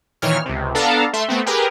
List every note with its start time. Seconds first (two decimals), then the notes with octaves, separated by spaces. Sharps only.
0.22 A#2 D#3 E3 C#5 F6
0.46 C#2 C3
0.75 B3 D4 A4 F5 A5 A#5
1.13 A3 E5 C6
1.28 A3 B3 C4
1.46 G4 G#4 A#4 B4